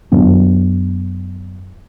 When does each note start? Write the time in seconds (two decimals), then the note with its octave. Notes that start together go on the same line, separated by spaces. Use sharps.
0.12 F#2 F#3 B3 D4